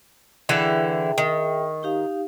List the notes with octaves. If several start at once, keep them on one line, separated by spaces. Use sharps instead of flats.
D3 E3 E4 G#4 E5 G5
D#3
D#4 G4 F5